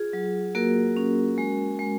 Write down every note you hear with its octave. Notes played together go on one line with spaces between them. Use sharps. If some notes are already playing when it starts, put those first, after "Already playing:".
Already playing: F4 G#4
F#3
A#3 F#4 A#4
C#4
G#3
G#3